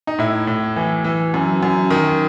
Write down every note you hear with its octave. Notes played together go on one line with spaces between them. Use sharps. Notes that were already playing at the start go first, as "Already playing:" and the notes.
D#4
A2 E4
A2
E3
E3
F#2
F#2
D#3